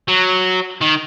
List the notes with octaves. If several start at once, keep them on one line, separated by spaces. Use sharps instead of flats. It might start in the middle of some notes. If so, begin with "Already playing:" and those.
F#3
D#3